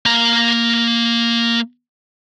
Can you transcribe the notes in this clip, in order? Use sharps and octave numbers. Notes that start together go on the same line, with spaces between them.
A#3 A#5